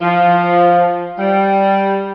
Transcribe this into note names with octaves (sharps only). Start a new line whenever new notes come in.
F3
G3